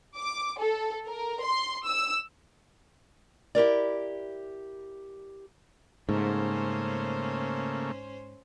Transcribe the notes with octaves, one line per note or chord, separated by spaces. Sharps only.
D6
A4
A#4
C6
E6
E4 G4 A#4 D5
G#2 C#3 A3 A#3 C#4 C5